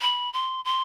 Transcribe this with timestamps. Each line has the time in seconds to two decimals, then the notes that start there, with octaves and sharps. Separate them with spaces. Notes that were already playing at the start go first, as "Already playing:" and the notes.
0.01 B5
0.33 C6
0.65 C6